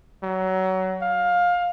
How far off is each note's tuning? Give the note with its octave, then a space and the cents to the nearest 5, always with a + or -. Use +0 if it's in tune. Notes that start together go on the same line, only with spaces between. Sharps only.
F#3 +25
F5 +20